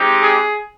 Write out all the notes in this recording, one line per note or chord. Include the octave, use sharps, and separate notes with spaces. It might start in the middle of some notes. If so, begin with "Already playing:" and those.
Already playing: G#3 C4 D#4 G4
G#4